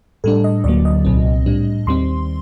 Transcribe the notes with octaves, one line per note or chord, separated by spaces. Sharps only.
A2 G3 D4 A4
D#5
D2 D3 F#3 A#3 D5
D#5
C2 A#2 F#3 C4
A2 G3 D4
D#2 D#3 G3 C4 C6